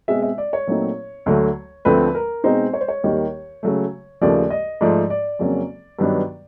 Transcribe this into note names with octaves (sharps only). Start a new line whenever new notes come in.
B2 G#3 C4 E5
E5
D5
C#5
A#2 F#3 A3 C4 D#4
D2 D3 F#3 A3
D2 D3 F3 A3 C4 B4
A#4
B2 G#3 C4 D#4 C5
C#5
C5
C#5
D#2 D#3 G3 A#3
C#3 F#3 A3
D#2 C#3 F3 A3 D5
D#5
G#2 F3 A3 D5
D5
F2 C#3 F#3 A#3 C#4
G2 D#3 F#3 B3 D4